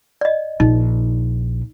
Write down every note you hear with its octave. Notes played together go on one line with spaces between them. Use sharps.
D5 D#5
A#1 D#4